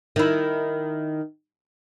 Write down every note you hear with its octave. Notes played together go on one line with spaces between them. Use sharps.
D#3 E4